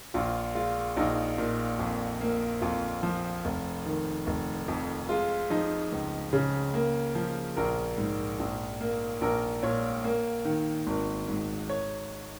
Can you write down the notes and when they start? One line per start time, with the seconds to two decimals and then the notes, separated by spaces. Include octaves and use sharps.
0.14 A#1 F4
0.55 G#3 F4
0.97 A#1 D#4
1.38 A#2
1.79 F2
2.21 A#3
2.62 F2 F4
3.03 F3
3.45 F1
3.86 D#3
4.27 F1
4.68 F2
5.09 G#3 F4
5.50 F3 D#4
5.92 C#2
6.33 C#3
6.74 A#3
7.15 F3
7.57 A#1 A#4
7.98 G#2
8.39 A#1
8.81 A#3
9.21 A#1 A#4
9.63 A#2 C#5
10.04 A#3
10.45 D#3
10.87 G#1
11.28 G#2
11.69 C#5